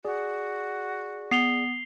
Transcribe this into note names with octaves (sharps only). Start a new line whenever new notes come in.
F#4 G#4 D5
B3 C7 F7 G7